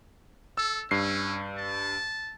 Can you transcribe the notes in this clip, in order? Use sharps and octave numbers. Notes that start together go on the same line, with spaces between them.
A4 E6
G2 C#4 C7
A5